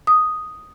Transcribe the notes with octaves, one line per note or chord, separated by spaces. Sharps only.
D#6